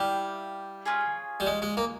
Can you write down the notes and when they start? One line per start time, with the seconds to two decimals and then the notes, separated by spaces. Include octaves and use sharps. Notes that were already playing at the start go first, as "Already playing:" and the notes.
Already playing: G3 E4 G4 F5
0.86 C#4 F4 G#4
1.40 G3
1.47 G#3
1.62 G#3
1.77 A#3